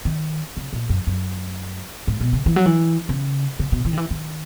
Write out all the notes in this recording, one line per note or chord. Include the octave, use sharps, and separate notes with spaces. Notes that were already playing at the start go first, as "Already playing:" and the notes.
D#3
C#3
A#2
F#2
F#2
G#2
B2
C#3
E3
F#3
E3
C#3
C#3
B2
E3
D#3
E3
D#3